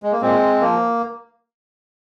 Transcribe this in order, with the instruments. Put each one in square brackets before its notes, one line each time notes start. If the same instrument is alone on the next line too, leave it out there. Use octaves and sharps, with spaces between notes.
[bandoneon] G#3
A#3
A#2 G#3 C4
F3 A#3